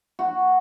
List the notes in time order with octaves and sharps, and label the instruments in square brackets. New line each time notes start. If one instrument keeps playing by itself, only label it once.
[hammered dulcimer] F#4